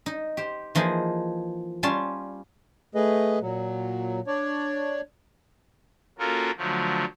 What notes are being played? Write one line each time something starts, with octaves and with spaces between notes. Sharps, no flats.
D#4
G4 C5
E3 F3 A#3 D#4 G#4
G3 C#4 F4 A5 C6
A3 G#4 B4 D#5
A#2 F#3
D4 C#5 D5
A#3 C#4 F4 F#4 A4 A#4
D3 F3 F#3 A3